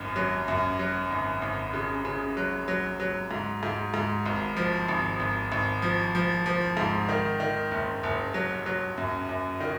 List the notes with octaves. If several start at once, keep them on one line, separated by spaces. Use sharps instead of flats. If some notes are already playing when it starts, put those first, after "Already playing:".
Already playing: G#1 F#2
F#3
F#2
F#3
G#1
G#1
C#3
C#3
F#3
F#3
F#3
G#2
G#2
G#2
G#1
F3
G#1
G#1
G#1
F3
F3
F3
G#2
D#3
D#3
F#1
F#1
F#3
F#3
F#2
F#2
D#3